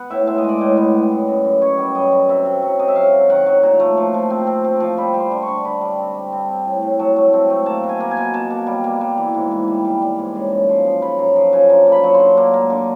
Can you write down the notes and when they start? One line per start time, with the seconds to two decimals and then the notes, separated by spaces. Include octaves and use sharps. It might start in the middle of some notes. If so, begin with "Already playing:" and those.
Already playing: B3 F#5
0.10 A2 E5
0.27 G#3 E5
0.38 D#5
0.44 G#3 D5
0.59 A2 D#5
0.77 B3
0.94 G3
1.11 F#2
1.28 F#2
1.45 F#2
1.62 F#2 C#5
1.78 G3
1.95 F#2 D#5
2.12 F#2
2.29 C3 E5
2.45 C3
2.62 F#3
2.79 C3 D#5
2.88 E5
2.96 F#3 F5
3.13 C3
3.30 D#3 F#5
3.46 F#3
3.63 A#2 A#5
3.80 A3
3.97 F3
4.14 F3
4.30 C4
4.47 C4
4.64 C4
4.80 F3
4.97 G3 B5
5.14 G3
5.20 C6
5.31 D3
5.42 C#6
5.48 D3
5.65 D3 B5
5.81 G3
5.98 C4
6.15 G3
6.32 C4
6.49 C4
6.65 A2
6.82 A2
6.99 F#3 A5
7.16 A3
7.33 C4
7.50 A3
7.66 A#3 A5
7.84 B2
7.89 G#5
8.00 A#3
8.11 G#5
8.17 B2
8.34 B2 A5
8.50 A#3
8.67 G3
8.84 A#3
9.01 G3
9.17 E3
9.34 G#2
9.51 E3
9.68 G3
9.85 G3
10.02 G3
10.19 G#2
10.35 C#3
10.52 F#2
10.69 F3
10.86 F3
11.02 C#3 B5
11.19 F#2 A#5
11.36 F3 A#5
11.53 C#3 G#5
11.69 D3 A#5
11.87 A#3
11.92 B5
12.04 F#3
12.15 C6
12.20 D3
12.37 A#3
12.54 A#3
12.70 D3